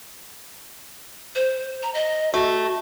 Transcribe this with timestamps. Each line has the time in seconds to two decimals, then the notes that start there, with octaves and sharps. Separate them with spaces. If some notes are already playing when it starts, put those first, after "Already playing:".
1.35 C5
1.83 A#5
1.94 D#5
2.34 A3 F#4